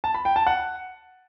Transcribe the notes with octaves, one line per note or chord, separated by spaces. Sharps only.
A5
B5
G5
A5
F#5